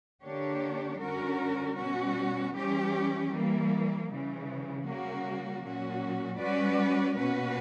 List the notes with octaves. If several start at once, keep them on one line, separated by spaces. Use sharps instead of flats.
D3 A#3 D4 G4 C#5
D3 G3 C#4 F#4 A#4
B2 G3 C#4 F#4
E3 G3 C#4 G4
E3 G3 A#3
C#3 E3 G3
C#3 G3 A#3 C#4 F#4
A#2 F#3 C#4 F#4
G3 C#4 F#4 B4 D5
B2 A#3 C#4 F#4 B4